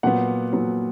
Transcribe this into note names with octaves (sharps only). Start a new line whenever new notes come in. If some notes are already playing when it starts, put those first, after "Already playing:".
A#2 F#3 B3 F#5
A#2 F#3 B3